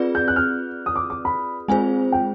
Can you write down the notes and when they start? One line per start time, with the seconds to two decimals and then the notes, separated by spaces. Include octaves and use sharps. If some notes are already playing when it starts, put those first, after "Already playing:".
Already playing: C4 F4 G#4 B4 D5
0.15 G6
0.28 F#6
0.36 F6
0.86 D#6
0.96 D6
1.10 D6
1.25 B5
1.68 G#3 C4 F4 G#4 C5 G#5
2.12 G5